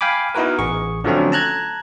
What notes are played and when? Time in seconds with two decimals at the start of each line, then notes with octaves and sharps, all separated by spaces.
0.01 F5 G5 G#5 B5 D6
0.35 B3 D#4 E4 F#4 A#4 B4
0.59 A1 G#4 C#6
1.04 D3 F3 F#3 A3 C4 C#4
1.32 A5 A#5 F#6 G#6